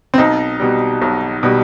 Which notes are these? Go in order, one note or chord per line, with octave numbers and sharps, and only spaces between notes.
C4
B1 D#4
B2 G3
B1
B2 G3